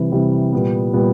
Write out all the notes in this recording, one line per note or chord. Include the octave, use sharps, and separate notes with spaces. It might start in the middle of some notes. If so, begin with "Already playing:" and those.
Already playing: C3 E3 G3
C3 E3 G3
A#2 G3 B3
A#2 G3 B3